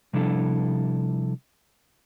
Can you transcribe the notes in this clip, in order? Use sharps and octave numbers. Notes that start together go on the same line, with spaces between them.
C3 F3 G3 D4 E4 A4